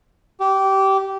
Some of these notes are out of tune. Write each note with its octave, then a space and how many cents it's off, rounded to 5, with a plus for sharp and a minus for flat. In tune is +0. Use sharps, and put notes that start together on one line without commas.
G4 -20